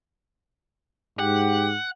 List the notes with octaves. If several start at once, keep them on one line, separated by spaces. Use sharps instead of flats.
G#2 G4 F#5